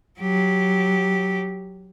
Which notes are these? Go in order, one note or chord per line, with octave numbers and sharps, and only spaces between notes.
F#3 G4